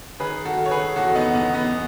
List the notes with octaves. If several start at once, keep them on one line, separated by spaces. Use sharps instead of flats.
D#3 G#4 B4
F#4 A4
D#3
C#5
G#4 B4
E2 F#4 A4
B3 D#4
E2 B3
B3